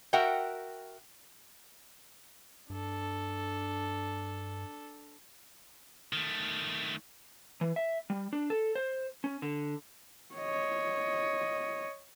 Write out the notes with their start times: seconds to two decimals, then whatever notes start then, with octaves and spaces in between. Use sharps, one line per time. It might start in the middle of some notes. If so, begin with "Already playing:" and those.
0.13 F#4 A#4 E5 F#5 G5
2.70 G2 D4 A4
6.13 D#3 A3
7.61 E3
7.76 E5
8.10 G3
8.33 D4
8.50 A4
8.75 C5
9.24 C#4
9.42 D3
10.35 C#5 D#5